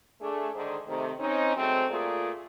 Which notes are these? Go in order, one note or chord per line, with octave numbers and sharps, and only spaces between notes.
A3 D4 G#4
G#2 D3 D#3 G#4 C5
C3 D#3 A3
C4 C#4 D#4
F#3 G#3 A3 C4
A#2 A3 F4 G#4 A#4 D5